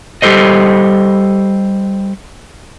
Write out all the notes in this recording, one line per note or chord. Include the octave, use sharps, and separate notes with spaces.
G3 G4 A4 C5 D#5